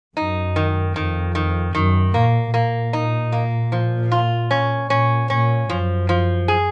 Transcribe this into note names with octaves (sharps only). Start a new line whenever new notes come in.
F#2 D#4
D#3
F2 D#3
D#3
F#2 D#3
A#2 A#3
A#2 A#3
D#4
A#3
F3
F4
C#4
A#2 C#4
A#2 C#4
F#2 F3
F3
G#4